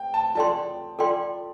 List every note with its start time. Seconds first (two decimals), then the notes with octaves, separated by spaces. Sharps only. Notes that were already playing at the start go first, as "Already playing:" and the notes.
Already playing: G5
0.14 A5
0.35 F4 A4 D5 G5 A5 C6
0.99 F4 A4 D5 G5 C6